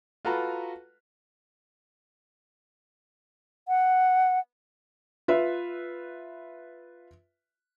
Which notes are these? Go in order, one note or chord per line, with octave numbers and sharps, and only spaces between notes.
F4 F#4 A4 B4 A#5
F#5
F4 B4 E5